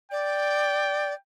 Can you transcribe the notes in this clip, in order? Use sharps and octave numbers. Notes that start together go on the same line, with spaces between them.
D5 G5